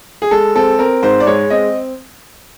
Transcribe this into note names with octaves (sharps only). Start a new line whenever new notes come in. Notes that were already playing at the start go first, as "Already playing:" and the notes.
G#4
G#3 A4
C4 A4
C4 A#4
G#2 C5
D5
G#3 C#5
C4 D#5